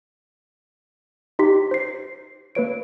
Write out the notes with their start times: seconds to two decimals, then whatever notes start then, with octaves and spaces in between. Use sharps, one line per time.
1.39 D#4 G4 C6 B6
1.71 C5 C7
2.55 A#3 B4 C#5 D7